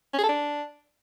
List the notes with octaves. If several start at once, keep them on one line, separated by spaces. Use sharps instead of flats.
C#4
G#4
A4
D4